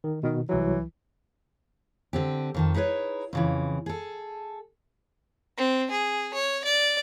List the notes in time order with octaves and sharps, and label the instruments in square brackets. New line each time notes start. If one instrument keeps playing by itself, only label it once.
[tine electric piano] D#3
[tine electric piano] B2 [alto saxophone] D#3
[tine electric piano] C2 F#3 [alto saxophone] E3
[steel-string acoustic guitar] D3 C4 G4
F2 D#3 A5
D#4 E4 G#4 B4 C#5
F2 C#3 E3
G#4 A4
[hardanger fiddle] C4
G#4
C#5
D5